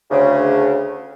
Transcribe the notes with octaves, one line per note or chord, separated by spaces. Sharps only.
D2 C#3